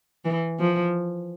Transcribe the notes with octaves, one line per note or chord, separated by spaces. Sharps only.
E3
F3